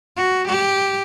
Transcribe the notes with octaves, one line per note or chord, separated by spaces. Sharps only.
F#4
G4